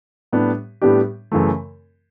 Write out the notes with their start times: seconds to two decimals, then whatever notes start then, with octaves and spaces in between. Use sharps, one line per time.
0.32 A2 G3 B3 D4 G4
0.82 A2 G3 B3 D4 G4
1.32 F#2 C#3 E3 A3